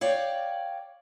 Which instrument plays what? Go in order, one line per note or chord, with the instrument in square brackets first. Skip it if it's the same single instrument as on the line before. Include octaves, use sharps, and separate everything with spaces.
[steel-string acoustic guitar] C#5 D5 F5 G5